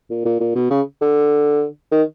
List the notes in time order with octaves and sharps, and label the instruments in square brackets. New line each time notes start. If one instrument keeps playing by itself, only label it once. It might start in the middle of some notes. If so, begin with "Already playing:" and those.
[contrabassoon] A#2
A#2
A#2
B2
C#3
D3
D#3